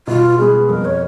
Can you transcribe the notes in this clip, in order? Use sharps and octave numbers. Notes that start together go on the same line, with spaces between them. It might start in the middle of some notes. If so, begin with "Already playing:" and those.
B2 F4
G#3 B3 G#4
F2 A#4
C#5